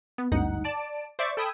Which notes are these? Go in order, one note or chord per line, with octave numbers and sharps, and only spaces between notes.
B3
G#1 D2 G2 D#4 F#5
D5 A5 D7
C5 D5 E5 C#6 D6
A4 G5 B5 D#6 E6 G#6